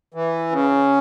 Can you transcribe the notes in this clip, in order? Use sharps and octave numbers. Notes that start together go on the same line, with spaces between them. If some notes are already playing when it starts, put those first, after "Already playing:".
E3
C#3